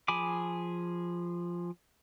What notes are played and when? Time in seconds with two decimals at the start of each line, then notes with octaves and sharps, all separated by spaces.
0.08 F3 G#4 G#5 B5 D6